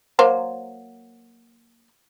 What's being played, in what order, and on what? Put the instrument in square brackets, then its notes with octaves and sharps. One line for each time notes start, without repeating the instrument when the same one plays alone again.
[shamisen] F#3 A#3 C5